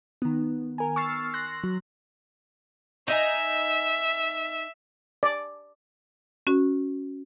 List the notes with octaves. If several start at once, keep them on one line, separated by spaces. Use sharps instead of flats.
D#3 B3
A#4 G#5
C#6 E6 F6 A6 C7
C6 F#6 A#6
F#3
D#4 D#5 E5 G#5
D5
C#4 F#4